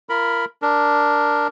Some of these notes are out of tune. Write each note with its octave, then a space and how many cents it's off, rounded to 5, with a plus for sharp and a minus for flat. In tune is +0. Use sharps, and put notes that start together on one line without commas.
F4 -40 A#4 +0 B5 +0
D4 +0 A#4 +0